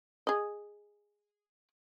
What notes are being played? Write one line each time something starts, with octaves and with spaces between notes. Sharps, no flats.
G#4 D#5